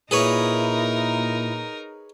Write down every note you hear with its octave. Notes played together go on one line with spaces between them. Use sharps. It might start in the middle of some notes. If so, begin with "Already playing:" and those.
A#2 D#4 E4 G#4 A#4 B4 C#5